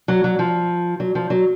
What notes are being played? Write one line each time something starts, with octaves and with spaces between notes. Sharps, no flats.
F#3
F#3
F3
F#3
F3
F#3